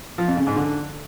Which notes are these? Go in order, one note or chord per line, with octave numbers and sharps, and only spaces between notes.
F3
F2
C#3
G#2
D3